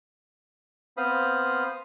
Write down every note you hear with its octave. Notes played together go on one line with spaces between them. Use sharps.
B3 C4 C5 F5 B5 D#6